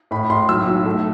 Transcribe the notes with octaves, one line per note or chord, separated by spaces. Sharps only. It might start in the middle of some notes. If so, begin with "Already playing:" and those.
A2 B5
A2 C6
B1 E6
B1
A3